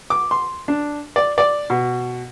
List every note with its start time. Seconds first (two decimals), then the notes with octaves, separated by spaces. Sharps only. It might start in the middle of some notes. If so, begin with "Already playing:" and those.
0.10 D6
0.31 C6
0.68 D4
1.16 D5
1.38 D5
1.70 B2